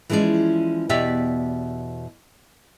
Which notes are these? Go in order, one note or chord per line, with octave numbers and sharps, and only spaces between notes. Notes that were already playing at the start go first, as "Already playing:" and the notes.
E3 F3 G#3 C#4 D5
E2 B2 G4 D5 E5